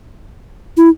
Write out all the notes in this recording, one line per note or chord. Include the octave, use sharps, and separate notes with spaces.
E4